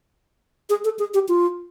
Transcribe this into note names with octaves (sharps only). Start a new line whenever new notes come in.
G#4
A4
G#4
G4
F4